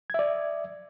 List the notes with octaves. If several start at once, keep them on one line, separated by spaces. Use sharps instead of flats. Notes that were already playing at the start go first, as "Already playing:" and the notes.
D5 E5 G#6